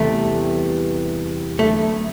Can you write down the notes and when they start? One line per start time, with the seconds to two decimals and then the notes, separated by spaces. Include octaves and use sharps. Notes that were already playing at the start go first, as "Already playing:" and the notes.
Already playing: E2 C3 E3 G3 A3 B3
1.59 D3 F#3 A3 B3